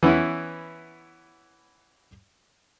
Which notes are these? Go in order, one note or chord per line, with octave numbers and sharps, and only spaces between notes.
E3 B3 C#4 E4